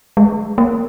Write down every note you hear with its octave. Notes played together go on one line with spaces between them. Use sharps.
G#3
A#3